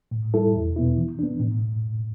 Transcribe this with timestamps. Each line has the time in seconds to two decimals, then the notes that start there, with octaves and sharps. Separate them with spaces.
0.11 A2
0.34 G3 E4 A4
0.55 E2
0.76 B2 B3 E4
0.97 E3
1.19 B3 D4
1.40 A2